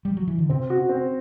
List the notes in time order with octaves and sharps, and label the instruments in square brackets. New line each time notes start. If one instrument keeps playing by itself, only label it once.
[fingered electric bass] G3
F#3
E3
D3
[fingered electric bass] C3 [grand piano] C4
[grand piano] F#4
C4